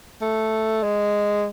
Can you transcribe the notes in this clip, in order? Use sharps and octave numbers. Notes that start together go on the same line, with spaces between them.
A3
G#3